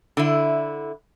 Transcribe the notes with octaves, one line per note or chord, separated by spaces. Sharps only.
D3 E4